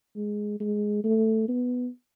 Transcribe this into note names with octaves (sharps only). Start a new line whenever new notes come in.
G#3
G#3
A3
B3